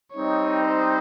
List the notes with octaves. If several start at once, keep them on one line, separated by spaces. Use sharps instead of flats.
G3 C4 D#4 C#5
C5